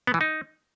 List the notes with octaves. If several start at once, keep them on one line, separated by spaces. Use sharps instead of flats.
B3
E3
D#4